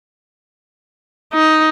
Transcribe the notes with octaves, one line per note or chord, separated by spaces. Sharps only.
D#4